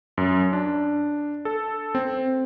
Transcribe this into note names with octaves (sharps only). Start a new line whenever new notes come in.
F#2
D4
A4
C4